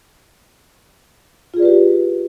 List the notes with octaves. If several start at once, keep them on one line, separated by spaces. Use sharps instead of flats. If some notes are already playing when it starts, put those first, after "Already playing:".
F4 G4 G#4 B4 D5